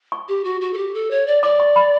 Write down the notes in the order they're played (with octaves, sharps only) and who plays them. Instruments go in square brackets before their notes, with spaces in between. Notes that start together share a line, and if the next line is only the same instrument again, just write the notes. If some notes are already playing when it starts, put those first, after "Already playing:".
[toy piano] C#6
[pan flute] G4
F#4
F#4
A4
G4
A4
C#5
D5
[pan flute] D5 [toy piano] D6
[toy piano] C#6
B5